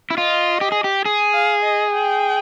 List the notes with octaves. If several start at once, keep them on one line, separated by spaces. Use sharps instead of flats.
E4
F4 D#5
G4
G#4
G4
G#4
F5
D#5
G5